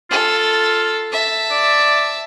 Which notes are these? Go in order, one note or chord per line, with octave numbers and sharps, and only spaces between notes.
F4 A4
E5 A5
D5